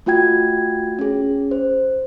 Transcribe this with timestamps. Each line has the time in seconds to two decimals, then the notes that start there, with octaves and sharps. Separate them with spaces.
0.06 A3 F4 F#4 G5 G#6
0.99 C#4 G#4
1.51 C5